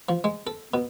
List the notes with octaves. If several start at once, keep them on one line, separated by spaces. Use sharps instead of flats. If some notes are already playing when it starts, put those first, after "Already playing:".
F3
G#3
A4
B2